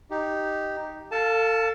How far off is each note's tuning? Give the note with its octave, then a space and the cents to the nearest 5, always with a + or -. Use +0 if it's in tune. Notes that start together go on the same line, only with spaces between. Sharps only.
D#4 +0 G4 +0
A4 +35 F5 +0 A5 -5